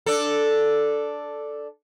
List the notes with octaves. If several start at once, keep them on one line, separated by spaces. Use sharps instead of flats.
D4 A4